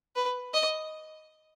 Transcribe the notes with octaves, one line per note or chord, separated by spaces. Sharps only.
B4
D#5